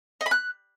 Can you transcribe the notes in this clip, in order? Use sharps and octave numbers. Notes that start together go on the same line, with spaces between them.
D#5
B5
F#6